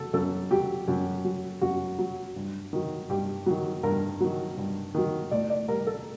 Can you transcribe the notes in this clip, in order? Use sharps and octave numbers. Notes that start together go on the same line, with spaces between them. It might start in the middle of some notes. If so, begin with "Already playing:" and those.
Already playing: F#3 A4
F#2 A4
F#3 G4
F#2
F#3
F#2 F#4
F#3
G2
D#3 F#3
G2 G4
D#3 F#3
G2 A#4
D#3 F#3
G2
D#3 F#3
A2 D5
D5
G3 A#4
A4